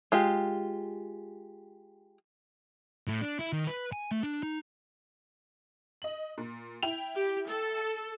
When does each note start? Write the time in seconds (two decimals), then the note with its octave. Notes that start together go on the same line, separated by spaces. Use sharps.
0.12 G#3 F4 G4
3.07 A2
3.21 D4
3.39 E4
3.53 D#3
3.67 B4
3.92 G#5
4.11 A3
4.23 D4
4.43 D#4
6.02 D#5 F#7
6.38 A#2
6.83 E4 G5 F7
7.16 G4
7.49 A4